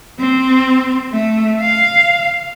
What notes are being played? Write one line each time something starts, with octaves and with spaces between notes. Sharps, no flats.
C4
A3
F5